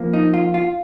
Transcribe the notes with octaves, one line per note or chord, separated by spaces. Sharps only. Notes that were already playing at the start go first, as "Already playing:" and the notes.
Already playing: F2 F3 A#3
D#4
F4
F4